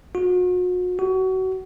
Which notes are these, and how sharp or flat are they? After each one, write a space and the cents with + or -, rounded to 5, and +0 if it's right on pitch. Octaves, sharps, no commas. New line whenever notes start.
F#4 -40
F#4 +25